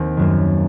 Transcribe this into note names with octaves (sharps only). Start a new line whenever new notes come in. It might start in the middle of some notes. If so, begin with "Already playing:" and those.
Already playing: D#2 C4
F#2 D#3 F#3 A#3